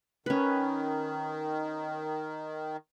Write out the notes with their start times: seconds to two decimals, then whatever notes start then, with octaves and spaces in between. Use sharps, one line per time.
0.26 D#3 C#4 B4